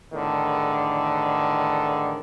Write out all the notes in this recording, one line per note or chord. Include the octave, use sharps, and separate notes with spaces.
E2 A2 D3 D#3